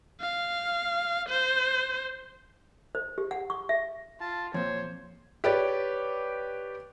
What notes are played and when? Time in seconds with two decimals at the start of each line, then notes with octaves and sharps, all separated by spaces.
0.21 F5
1.29 C5
2.95 C5
3.18 G4
3.31 F#5
3.50 C#6
3.69 E5
4.21 F4 A5
4.54 F2 A#2 C5 C#5
5.44 G4 B4 C#5 D5